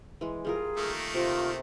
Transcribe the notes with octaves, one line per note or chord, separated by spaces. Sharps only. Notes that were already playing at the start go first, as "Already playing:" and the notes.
E3 G#3
G3 F4 G#4 A#4
D#3 A3 A#3
C3 F4